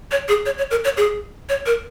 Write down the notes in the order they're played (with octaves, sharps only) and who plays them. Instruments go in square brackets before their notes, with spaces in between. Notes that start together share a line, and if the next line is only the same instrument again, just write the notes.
[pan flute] C#5
G#4
C#5
C#5
A#4
C#5
G#4
C#5
A#4